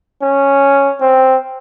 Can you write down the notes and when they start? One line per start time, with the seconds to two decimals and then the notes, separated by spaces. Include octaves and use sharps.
0.22 C#4
1.01 C4